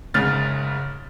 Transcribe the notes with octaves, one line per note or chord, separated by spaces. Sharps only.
F#1 G#2 C#3 F6 A6